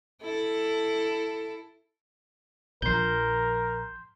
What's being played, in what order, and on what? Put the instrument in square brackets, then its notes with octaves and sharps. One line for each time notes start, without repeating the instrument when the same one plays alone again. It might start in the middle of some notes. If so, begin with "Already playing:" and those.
[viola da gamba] E4 A4
[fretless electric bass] A#1 F3 [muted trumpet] A#4 [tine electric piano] C6 G6